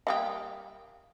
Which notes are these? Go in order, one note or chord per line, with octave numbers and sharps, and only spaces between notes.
G3 A#3 G4 E5 F5 D#6